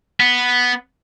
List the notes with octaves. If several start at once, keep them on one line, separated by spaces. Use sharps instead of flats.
B3